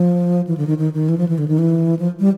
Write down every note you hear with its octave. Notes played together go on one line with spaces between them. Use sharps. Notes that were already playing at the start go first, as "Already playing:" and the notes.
Already playing: F3
E3
D3
D#3
D#3
D#3
E3
F3
E3
D3
D#3
E3
F3
G3